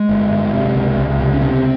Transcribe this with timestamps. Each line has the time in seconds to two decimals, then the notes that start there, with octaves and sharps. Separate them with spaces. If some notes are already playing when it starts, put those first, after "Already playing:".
Already playing: G#3
0.09 G1
0.31 G1
0.53 C3
0.76 C#2
0.98 C#2
1.20 C3
1.33 C#4
1.41 C3 C4